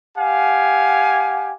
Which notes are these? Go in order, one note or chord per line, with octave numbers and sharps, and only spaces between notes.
G4 F5 F#5 G#5